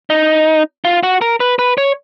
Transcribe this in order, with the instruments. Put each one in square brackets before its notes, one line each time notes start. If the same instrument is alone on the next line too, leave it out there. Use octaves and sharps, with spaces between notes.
[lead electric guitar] D#4
F4
F#4
A#4
B4
B4
C#5